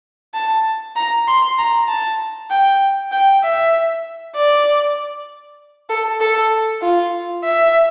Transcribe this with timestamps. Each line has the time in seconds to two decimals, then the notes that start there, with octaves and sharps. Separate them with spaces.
0.34 A5
0.96 A#5
1.27 C6
1.58 A#5
1.88 A5
2.50 G5
3.12 G5
3.43 E5
4.35 D5
5.89 A4
6.21 A4
6.82 F4
7.44 E5